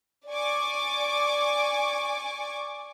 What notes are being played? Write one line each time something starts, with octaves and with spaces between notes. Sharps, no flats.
D5 G#5 C#6 D6